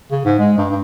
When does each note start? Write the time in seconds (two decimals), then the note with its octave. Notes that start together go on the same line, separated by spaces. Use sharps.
0.11 C#3
0.25 G#2
0.39 G#3
0.58 G2
0.70 G2